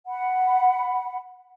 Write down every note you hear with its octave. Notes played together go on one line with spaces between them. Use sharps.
F#5 B5